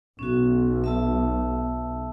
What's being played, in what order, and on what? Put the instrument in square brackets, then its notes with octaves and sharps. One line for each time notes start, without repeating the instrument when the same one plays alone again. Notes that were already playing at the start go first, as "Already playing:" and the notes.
[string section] B1 [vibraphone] C#4 F#4
[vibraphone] E5 A5 E6